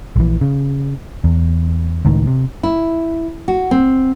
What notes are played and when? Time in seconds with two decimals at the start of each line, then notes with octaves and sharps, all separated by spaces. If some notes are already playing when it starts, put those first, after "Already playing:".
0.16 A#1 E3
0.41 C#3
1.24 E2
2.05 C#2 A2 D#3
2.27 C3
2.63 E4
3.48 F#4
3.71 C4